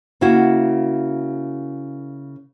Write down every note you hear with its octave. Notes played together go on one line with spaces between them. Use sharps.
C#3 A#3 E4 F#4